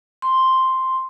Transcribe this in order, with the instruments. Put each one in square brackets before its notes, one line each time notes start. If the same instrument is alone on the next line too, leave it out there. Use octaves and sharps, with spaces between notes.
[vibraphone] C6